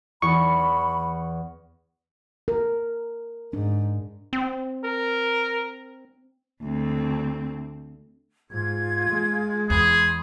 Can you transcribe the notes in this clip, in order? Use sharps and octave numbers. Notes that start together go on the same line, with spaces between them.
E2 B5 C#6
A#4
G#2 D4
C4
A#4
D2 C4
G#2 F4 G#6
G#3
E2 G#4 B5 C6